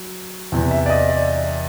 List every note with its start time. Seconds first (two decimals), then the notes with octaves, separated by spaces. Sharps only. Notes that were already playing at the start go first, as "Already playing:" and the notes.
Already playing: F#3
0.52 E2 C3 E3
0.71 E5
0.86 D5
0.90 D#5
1.09 D5